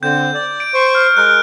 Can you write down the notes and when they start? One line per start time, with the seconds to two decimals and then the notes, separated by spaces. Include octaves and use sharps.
0.03 D3 C4 G6
0.34 D5
0.60 D7
0.74 C5 C#6
0.95 F6
1.17 G#3 A#4 F#6